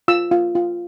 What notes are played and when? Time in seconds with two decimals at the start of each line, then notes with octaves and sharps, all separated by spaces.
0.08 F4 E6
0.31 F4
0.55 F4